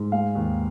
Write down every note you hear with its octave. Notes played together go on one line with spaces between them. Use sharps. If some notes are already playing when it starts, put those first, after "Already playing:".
Already playing: G#2
G#3 F5
D#2